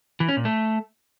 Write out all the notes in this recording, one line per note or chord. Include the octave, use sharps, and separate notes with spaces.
E3
C#4
A#2
A3